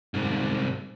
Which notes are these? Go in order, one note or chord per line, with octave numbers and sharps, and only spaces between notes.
C2 G#2